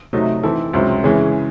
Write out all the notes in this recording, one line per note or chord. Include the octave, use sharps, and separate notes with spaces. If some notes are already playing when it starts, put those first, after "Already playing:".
C3 F#3 A3 D#4
E3 C4 E4 A4
C#2 C3 F#3 C4
C#3 E3 G#3 C#4 G#4